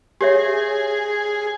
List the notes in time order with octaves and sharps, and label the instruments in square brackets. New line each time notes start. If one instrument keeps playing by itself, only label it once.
[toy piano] G4 C#5 E5 [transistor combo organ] G#4